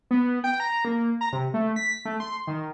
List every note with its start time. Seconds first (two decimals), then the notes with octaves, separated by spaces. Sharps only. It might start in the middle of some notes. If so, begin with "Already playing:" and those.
0.11 B3
0.44 G5
0.60 A#5
0.85 A#3
1.21 A#5
1.33 C3
1.54 A3
1.76 B6
2.05 A3
2.20 C6
2.47 D#3